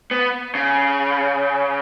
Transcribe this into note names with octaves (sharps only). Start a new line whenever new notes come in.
B3
C#3